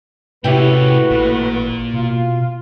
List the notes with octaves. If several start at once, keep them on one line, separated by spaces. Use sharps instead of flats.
A2 C3 G3 C#4 E4 F#4 G4 B4
A1 A#2
B2 F4